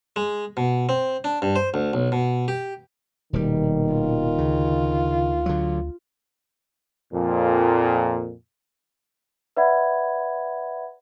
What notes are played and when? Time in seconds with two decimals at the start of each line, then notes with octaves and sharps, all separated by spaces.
0.16 G#3
0.57 B2
0.89 C4
1.24 D4
1.42 G2
1.56 C5
1.74 D2
1.93 B1
2.12 B2
2.48 G4
3.33 D#1 B2 D#3 G3
3.94 F4
4.38 D2 C#3
5.46 D3 F#3
7.13 F2 A#2
9.57 B4 D5 E5 F#5 B5 G#6